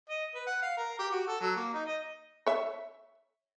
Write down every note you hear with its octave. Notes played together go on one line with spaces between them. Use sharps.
D#5
B4
F#5
F5
A#4
G4
F#4
A4
F#3
A#3
D#4
D#5
C#5 E5